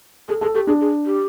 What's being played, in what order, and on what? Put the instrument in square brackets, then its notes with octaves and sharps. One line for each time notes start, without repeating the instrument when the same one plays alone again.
[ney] G#4 [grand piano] A4
[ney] G#4 [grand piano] A4
[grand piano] G4 [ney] A4
[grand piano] D4 [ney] G#4
[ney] G#4
G4